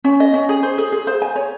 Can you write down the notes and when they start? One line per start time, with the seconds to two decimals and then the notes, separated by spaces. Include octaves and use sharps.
0.04 C#4
0.20 D#5
0.34 C#4
0.49 G#4
0.63 C5
0.78 G#4
0.92 G#4
1.07 C5
1.22 G#5
1.36 C#5